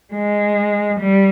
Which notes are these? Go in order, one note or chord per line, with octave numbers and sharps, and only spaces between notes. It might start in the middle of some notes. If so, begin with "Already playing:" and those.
G#3
G3